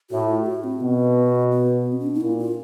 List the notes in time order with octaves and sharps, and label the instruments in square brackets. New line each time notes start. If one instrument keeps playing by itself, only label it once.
[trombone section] A2 [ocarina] F#4
[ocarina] F4
G4
F#4
C4
[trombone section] B2 [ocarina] B3
[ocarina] B3
C4
C#4
D4
D#4
[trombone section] A#2 [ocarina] E4
[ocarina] F4